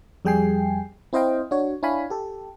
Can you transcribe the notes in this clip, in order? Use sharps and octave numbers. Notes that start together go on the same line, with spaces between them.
F2 G3 G#4 G5 G#5 C7
C4 E4 C5 D#5 F5 G5
D4 F#4 C#5
D4 E4 C#5 F5 G#5 B5
G4 A4